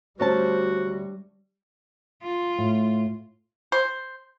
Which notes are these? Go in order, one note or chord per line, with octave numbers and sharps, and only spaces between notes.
D2 G3 C#4 F#4 C5 A5
F4
A2
C5